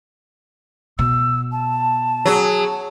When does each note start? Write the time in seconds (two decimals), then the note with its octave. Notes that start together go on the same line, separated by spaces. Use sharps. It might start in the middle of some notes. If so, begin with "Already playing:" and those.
0.99 B2 E6
1.52 A5
2.25 F#3 G#4